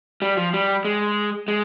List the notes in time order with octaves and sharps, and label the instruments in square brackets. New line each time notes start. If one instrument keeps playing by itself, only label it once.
[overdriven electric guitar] G3
F3
G3
G#3
G#3